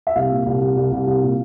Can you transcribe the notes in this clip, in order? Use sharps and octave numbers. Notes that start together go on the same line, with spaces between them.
E5
C2 F5
A#2
C2
C2
C2
C2
C2
A#2